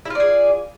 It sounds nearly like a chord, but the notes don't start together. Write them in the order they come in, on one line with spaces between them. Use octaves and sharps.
E4 F4 D5 G#4